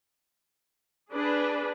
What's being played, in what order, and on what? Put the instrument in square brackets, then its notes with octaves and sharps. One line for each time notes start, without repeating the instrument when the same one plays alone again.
[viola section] D4 G#4 B4